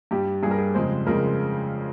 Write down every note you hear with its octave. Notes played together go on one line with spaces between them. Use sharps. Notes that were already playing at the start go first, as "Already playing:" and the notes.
G2 G3 G4
G2 G3 G#4 A#4
G#4
F2 C#3 G#3 C5
F2 C#3 G#3 A#4